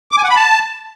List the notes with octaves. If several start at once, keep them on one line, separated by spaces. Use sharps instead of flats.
D6
G#5
F#5
B5
A5